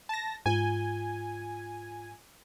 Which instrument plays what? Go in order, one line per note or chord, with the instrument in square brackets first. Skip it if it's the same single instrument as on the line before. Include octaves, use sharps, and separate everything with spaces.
[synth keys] A5 A#6
[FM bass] G#2 [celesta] F4 G7 [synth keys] G#5